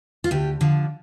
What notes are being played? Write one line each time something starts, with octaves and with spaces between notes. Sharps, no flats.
F4
D2 G4
D3 F3